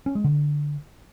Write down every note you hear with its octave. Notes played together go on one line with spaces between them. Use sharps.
C#4
G#3
D3